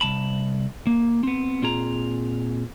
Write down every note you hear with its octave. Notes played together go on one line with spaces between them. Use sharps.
C2 A5 B5
A#3
B3 C4
A#2 C4 F4 G#4 A#5